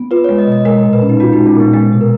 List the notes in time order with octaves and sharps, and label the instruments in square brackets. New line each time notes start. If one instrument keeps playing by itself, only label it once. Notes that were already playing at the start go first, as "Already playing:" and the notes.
Already playing: [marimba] B3
[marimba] F4 [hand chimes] B4
[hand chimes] C#5
[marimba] G#3
[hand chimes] D#5
[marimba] B2
[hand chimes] D#5
[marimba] G#3 [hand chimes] A#4
[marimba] A#2
[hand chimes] B4
[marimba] C#4
[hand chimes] D#4
[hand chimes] F4 [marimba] F#4
[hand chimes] D#4
[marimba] G#3
[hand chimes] C#4
[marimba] A#2 [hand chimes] B3
[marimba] G#3 [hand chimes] B3
[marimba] B2
[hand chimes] A#4